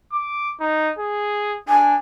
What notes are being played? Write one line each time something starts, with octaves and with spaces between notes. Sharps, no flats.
D6
D#4
G#4
D4 G#5